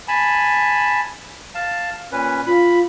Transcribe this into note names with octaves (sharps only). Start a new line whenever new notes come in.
G#5 A5 B5
F5 A5
A#2 C#4 B4
F4 B5